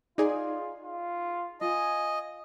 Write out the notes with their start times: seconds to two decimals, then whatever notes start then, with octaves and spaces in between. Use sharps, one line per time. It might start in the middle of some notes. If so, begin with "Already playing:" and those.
0.18 D#4 F4 G#4 D5 D#5
0.84 F4
1.61 F4 D#5 G#5